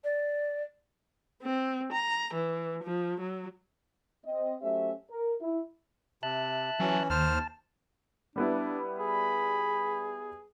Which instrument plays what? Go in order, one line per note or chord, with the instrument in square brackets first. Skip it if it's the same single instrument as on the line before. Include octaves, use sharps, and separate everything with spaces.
[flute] D5
[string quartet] C4
A#5
E3
F3
F#3
[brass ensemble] C4 D#5
F#3 A3 C#4 G4 C5 E5
A#4
E4
[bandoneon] C3 [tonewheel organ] E5 A5 F#6
[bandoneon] E3 C#4 [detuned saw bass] F#3
[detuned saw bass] D#2 [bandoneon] C5 F6 [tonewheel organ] A5
[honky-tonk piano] G3 B3 E4 [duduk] D4
[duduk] G#4 [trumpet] B5